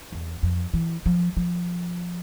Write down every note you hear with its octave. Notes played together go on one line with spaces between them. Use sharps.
E2
F2
E3
F3
F3